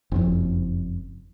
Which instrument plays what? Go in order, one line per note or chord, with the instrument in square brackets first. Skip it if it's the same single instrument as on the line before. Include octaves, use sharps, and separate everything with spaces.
[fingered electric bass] F#1 F2